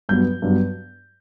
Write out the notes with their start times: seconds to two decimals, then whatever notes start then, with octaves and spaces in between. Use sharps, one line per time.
0.09 G2 F#3 B3 G6
0.42 G2 F#3 B3